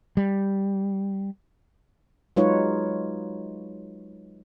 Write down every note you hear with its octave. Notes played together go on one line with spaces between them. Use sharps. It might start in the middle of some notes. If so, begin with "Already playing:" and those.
G3
F#3 G#3 D#4 F4 B4 C#5